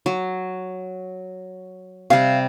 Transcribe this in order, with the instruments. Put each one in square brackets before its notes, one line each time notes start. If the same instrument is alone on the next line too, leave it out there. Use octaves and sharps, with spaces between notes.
[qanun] F#3
[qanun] C3 G3 [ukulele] F5